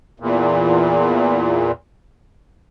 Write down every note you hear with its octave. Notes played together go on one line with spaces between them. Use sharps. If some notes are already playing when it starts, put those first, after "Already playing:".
E2 A#2